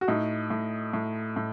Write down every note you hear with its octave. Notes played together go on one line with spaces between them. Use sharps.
F#4
A2 D#4
A2
A2
A2